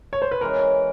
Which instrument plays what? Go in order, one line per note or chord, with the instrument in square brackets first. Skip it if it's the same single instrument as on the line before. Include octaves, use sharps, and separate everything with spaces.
[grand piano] C#5
C5
B4
[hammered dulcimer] E3 G#3 C#4 [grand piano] A#4